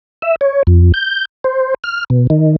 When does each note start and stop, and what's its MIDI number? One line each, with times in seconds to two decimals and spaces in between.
0.22 0.36 76
0.41 0.63 73
0.67 0.92 41
0.94 1.25 91
1.44 1.74 72
1.84 2.04 89
2.10 2.27 47
2.30 2.56 51